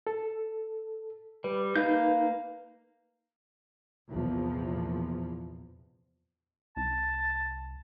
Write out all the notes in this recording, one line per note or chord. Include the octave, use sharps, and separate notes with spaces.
A4
G3 B4
A#3 D#4 B4 F5 G6
A#1 E2 C3 F3
C2 A5